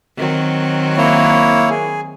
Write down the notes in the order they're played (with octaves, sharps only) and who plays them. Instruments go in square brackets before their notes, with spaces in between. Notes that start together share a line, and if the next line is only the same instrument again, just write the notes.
[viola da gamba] D#3 F#3 C4
[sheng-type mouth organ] A#3 E4 C#5
G#4